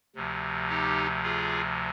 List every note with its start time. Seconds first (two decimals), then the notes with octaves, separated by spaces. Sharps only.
0.15 D2 C3 F3
0.69 D#4 G4
1.23 F4 G#4